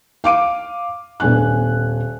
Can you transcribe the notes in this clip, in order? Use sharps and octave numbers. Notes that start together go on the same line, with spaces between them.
F5 D6 D7 D#7
D#1 B3 D4 G#5 F#6